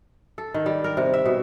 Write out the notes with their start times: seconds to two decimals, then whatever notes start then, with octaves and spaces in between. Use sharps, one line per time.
0.38 A4
0.54 D#3
0.66 G3
0.84 A#4
0.97 C3
1.14 E5
1.25 B2